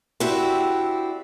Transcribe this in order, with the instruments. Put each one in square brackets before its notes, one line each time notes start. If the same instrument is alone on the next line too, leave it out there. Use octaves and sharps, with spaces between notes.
[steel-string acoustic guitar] C4 D4 E4 F#4 G4